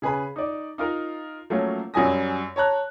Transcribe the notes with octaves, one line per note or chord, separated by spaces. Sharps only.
C#3 G#4 B4 B5
D#4 D5
D#4 F4 A#4
F3 F#3 A3 A#3 C#4 F4
F#2 F#3 G3 G#5 D#6 A#6
C#5 A5 A#5 F#6